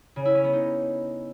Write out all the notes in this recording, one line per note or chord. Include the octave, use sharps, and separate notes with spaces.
C#3
E4
C#4
B3
D#4